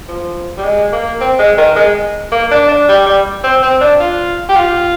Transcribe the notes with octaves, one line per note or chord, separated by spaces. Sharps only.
F3
G3
G#3
A#3
C4
G#3
D#3
G#3
A#3
D4
D4
G3
G3
C4
C4
D4
F4
G4
F4